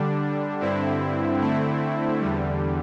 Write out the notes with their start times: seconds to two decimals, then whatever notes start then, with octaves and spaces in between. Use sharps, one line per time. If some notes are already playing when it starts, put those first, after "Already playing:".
Already playing: D3 G3 D4
0.60 G2 D3 C4 E4
1.40 D3 A3 C4 E4
2.20 E2 D3 G3